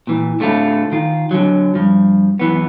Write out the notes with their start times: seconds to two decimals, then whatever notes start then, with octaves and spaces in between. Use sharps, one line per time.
0.07 A#2 E3
0.40 A2 D3 A3 F4 A4
0.92 D#3 F4
1.31 D3 F#3
1.75 G2 F3
2.39 F#2 E3 B3